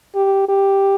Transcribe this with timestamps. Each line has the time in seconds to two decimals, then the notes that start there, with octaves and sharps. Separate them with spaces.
0.15 G4
0.49 G4